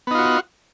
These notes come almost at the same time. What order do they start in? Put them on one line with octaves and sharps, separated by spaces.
B3 D#4 F4 F#4